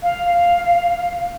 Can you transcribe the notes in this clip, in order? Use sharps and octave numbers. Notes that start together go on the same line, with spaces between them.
F5